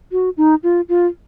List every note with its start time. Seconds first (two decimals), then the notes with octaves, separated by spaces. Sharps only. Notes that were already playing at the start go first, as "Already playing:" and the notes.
0.12 F#4
0.37 D#4
0.63 F4
0.89 F4